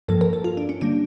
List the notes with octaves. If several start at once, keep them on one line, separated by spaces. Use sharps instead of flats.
G2 F3 A#3 A4
A#4
A4
F4
D4
C#4
D3 G3 A#3 D4